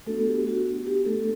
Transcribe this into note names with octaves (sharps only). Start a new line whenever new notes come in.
A3 B3 D4 F#4 A4
G4
F#4
G4
A3 A4